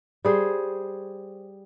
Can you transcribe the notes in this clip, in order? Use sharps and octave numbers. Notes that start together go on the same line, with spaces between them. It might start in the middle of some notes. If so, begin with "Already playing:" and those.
G3 G#4 C5